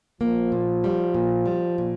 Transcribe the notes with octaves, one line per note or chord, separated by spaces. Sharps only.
F3 A#3
A#2
G3
A#2
G3
A#2